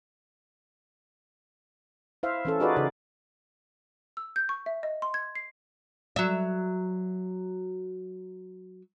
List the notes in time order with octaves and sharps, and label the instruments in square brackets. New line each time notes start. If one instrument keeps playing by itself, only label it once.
[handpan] E4 C5 E5 F5
E3 C#4 A4
D#4 F4 F#4 G#4 B4 D5
C#3 D#4 D5
[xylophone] E6
G6
C#6
E5
D#5
C6
G#6
C7
[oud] F#3 E5